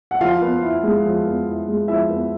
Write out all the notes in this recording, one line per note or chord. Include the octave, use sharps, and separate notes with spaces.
F#5
F3 F4 F5
B3
E4
G#3
F3
B3
E4
G#3
F3 E4 E5
B3